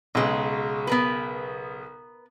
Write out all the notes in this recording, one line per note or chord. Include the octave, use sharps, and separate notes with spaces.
B1 C#3 F#3 G#3
B3 A#4 B4